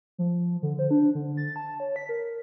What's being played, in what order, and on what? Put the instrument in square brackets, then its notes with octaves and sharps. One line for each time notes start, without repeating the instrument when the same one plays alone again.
[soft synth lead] F3
D3
C5
D4
D3
A6
A5
C#5
B6
A#4